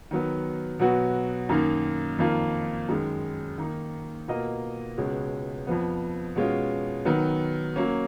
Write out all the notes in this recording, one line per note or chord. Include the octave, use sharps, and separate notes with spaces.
D#3 F#3 B3
B2 F#3 B3 F#4
F#2 D#3 A#3 D#4
F2 D#3 A#3 F4
F#2 D#3 G#3
D#3 A#3 D#4
B2 A#3 F4 A#4 D#5
C#2 B2 G#3 C#4
F2 F3 B3
B2 G#3 C#4 F4
D#3 F#3 B3
F#3 A#3 C#4